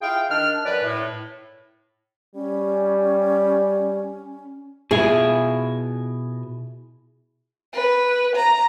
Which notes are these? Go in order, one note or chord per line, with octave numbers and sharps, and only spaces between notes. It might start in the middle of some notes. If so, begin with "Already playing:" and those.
E4 F4 G#4 F5 G5
D#3 D4 F6
F#2 B4 D5
A2
G3 C#4
B2 E4 F4 G#4 G#5
B4
A#5